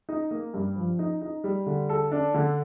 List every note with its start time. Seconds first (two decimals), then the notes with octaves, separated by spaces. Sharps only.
0.09 D#4
0.31 A#3
0.54 G2
0.76 F3
0.99 D#4
1.22 D#4
1.44 G3
1.66 D3
1.89 A4
2.12 D4
2.34 D3